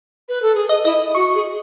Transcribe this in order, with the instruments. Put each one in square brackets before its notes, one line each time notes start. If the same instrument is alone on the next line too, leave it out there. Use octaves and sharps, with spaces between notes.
[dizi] B4
A4
G#4
[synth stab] D#5
[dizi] E4 [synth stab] D#5
[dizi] F#4 [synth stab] C#6
[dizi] G#4